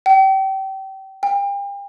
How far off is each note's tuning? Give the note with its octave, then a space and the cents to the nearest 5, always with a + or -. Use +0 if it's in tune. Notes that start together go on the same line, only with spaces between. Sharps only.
G5 -30
G5 +40